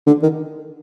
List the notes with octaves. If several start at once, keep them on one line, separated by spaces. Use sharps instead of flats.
D3
D#3